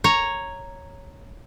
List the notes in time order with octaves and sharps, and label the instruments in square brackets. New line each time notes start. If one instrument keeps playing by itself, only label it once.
[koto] C#5 A#5